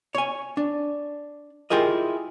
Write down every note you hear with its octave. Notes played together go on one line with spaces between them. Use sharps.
C#5 G#5
D4
E4 F4 G4 G#4 A#4 D#5